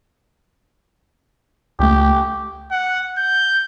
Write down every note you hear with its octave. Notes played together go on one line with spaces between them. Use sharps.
C#2 A3 G4
F#5
G6